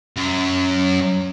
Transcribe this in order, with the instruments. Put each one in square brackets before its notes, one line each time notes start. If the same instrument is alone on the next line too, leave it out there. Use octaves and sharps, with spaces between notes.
[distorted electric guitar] F#2